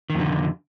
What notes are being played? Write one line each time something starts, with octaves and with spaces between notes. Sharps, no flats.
F2 D3 D#3